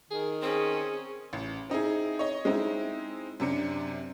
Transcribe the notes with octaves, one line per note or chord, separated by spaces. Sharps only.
D#3 G#4
C4 C#4 G#4
A1
C4 D#4 E4 G#4
C#5 D#5
G#3 C4 D#4 E4
F#2 C3 D4 C#7